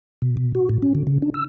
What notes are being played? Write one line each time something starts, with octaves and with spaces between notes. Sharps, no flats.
B2
B2
F#4
A2
C#4
D3
C#3
D4
E6